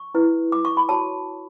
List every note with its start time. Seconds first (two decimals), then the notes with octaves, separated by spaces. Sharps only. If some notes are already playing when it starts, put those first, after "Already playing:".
Already playing: C#6
0.15 E4 B4
0.52 D6
0.65 C#6
0.77 B5
0.89 F#4 C#5 A5